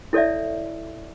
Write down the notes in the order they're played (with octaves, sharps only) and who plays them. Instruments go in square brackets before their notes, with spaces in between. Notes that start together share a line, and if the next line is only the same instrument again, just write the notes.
[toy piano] E4 A4 C#5 D5 E5